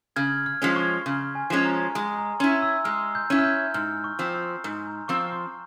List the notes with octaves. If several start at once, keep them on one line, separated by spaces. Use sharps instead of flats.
C#3 F6 G#6
F6
F3 G#3 C#4
C#6
C#3 C6
G#5
F3 G#3 C#4
A#5
G#3 G#5
A#5
C#4 E4 C6
E6
G#3 F6
G6
C#4 E4
F6
G6
G#2 F6
C#6
F3 C4
C6
G#2
A#5
F3 C4 C#6
C6